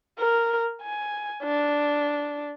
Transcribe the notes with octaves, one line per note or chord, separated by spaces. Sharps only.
A#4
G#5
D4